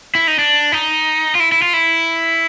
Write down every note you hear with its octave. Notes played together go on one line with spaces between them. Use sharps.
E4
D#4
D4
D#4
F4
E4
E4
F4
E4